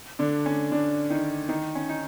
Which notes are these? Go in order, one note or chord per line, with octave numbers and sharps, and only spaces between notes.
D3 D4
C#4
D3 D4
D#3 D#4
D#3 D#4
C#4
D#4